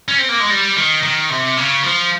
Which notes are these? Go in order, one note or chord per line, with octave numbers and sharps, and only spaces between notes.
C#4
C4
A#3
G#3
G3
D#3
D#3
C3
C#3
F3